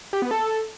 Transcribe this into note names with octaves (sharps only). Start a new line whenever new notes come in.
G4
B3
A4